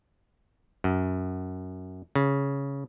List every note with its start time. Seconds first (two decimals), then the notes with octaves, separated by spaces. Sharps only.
0.84 F#2
2.15 C#3